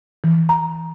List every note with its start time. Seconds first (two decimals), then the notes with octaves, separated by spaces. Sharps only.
0.24 E3
0.49 A#5